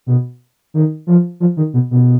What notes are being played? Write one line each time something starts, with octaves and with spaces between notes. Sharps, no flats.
B2
D#3
F3
F3
D#3
B2
B2